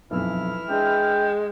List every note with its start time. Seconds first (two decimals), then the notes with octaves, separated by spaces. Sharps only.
0.11 B1 F2 E3 E4 F6
0.69 G#3 D4 G5